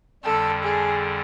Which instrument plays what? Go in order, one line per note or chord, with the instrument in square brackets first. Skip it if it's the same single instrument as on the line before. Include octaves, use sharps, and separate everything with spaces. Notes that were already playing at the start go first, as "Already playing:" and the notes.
[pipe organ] F2 D3 G3 [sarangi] A4
[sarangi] G#4